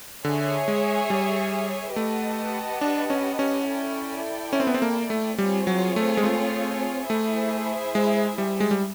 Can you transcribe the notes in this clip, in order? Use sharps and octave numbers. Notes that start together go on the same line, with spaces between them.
D3 G#4 C#5 E5
G#3
G3
A3 G4 B4 D#5 F#5 A5
D4
C#4
C#4
E4 A4 D5 G5
C#4
C4
B3
C4
A#3
A3
G3 C4 F4 G#4 C#5
F#3
A3
G#3
A3
A3 E4 G#4 C5 E5
G#3
G3
G#3
G3